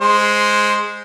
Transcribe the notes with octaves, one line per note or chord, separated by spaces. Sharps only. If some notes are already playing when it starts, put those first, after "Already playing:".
G#3 C5